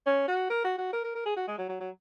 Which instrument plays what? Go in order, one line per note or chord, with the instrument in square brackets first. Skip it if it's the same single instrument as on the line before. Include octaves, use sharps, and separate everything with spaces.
[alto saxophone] C#4
F#4
A#4
F#4
F#4
A#4
A#4
A#4
G#4
F#4
G#3
F#3
F#3
F#3